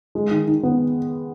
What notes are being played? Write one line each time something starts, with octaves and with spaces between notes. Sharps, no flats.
G#3
D#3
D#3
B3